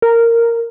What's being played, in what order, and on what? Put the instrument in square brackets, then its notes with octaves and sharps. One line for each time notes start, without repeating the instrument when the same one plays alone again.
[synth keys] A#4